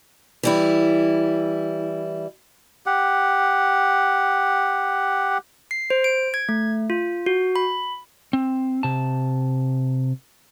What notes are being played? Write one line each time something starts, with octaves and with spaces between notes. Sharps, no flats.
E3 G3 E4
G4 F#5
C7
C5
D7
G#6
A3
F4
F#4
B5
C4
C3 A5